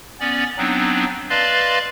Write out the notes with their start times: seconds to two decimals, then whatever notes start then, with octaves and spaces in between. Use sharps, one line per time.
0.20 B3 C#4 D5
0.58 F#3 B3 C4 D4 D#4
1.30 B4 D5 D#5 F5 A5 C6